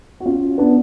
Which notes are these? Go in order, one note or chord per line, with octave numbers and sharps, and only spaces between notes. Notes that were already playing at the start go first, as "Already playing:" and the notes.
F#4
C#4 F4
B3 D4